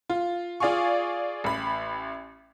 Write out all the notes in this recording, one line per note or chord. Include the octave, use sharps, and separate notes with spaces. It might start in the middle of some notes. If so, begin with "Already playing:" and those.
F4
F4 G#4 D5 F5 G#5 C#6
A1 B5